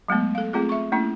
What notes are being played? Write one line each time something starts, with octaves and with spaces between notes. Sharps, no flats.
F#3 G#3 A3 B3
A4 F5
A3 C4 F4 G#4
E5 C#6
A3 A#3 C#4 E4